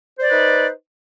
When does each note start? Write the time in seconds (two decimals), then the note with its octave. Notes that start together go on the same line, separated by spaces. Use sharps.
0.17 C5
0.21 D5
0.26 B4
0.30 D#4